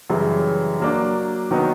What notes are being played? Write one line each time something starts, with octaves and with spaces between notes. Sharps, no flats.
F#2 C#3 E3 G3
F#3 A#3 D4
D#3 F#3 B3 D#4